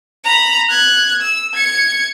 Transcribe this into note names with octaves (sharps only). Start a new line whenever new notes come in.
A#5 B5
F#6 G#6
E6
G#6 C#7